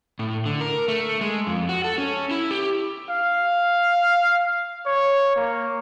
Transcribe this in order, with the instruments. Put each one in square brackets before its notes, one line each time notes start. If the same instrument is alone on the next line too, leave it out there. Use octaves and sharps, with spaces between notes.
[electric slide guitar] A2
D3
A#4
A3
G#3
F2
F#4
A4
C#4
E4
G4
[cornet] F5
C#5
A#3